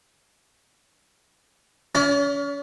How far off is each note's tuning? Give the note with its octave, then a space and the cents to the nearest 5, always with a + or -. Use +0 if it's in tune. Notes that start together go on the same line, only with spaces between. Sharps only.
C#4 +35 D5 -35